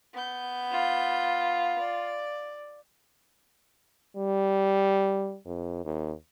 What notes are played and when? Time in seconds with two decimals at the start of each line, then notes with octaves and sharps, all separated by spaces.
0.13 B3 G6
0.72 F4
1.79 D5
4.16 G3
5.46 F2
5.85 D#2